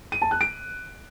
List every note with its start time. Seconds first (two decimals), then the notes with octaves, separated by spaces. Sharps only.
0.12 D#7
0.22 A5
0.31 F#6
0.41 D7